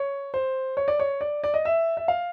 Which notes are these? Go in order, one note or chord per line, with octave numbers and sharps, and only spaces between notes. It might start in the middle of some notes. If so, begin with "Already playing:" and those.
Already playing: C#5
C5
C#5
D5
C#5
D5
D5
D#5
E5
E5
F5